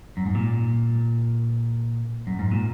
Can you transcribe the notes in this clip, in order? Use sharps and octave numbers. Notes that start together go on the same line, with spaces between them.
F#2
G#2
A#2
F#2
G#2
A#2